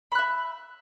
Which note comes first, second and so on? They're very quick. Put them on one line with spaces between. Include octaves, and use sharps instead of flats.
B5 F#6 E5